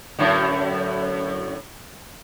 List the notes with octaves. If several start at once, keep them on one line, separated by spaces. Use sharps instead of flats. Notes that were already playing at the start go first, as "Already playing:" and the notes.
F#2 A2 D3